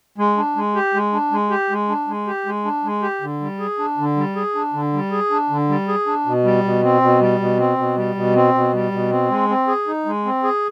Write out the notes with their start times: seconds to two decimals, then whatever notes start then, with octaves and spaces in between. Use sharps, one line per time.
0.18 G#3
0.37 D4
0.56 G#3
0.75 G4
0.94 G#3
1.13 D4
1.32 G#3
1.51 G4
1.70 G#3
1.89 D4
2.08 G#3
2.27 G4
2.46 G#3
2.65 D4
2.84 G#3
3.02 G4
3.21 D3
3.40 G3
3.60 G#4
3.79 D4
3.98 D3
4.17 G3
4.36 G#4
4.55 D4
4.74 D3
4.93 G3
5.11 G#4
5.31 D4
5.50 D3
5.69 G3
5.88 G#4
6.07 D4
6.26 B2
6.44 G3
6.64 B2
6.83 C4
7.02 B2
7.21 G3
7.40 B2
7.59 C4
7.78 B2
7.97 G3
8.15 B2
8.35 C4
8.54 B2
8.73 G3
8.92 B2
9.10 C4
9.30 G#3
9.49 C4
9.67 G#4
9.87 D#4
10.06 G#3
10.25 C4
10.43 G#4